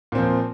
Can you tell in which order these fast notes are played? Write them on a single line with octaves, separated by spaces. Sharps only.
A#2 C4 F3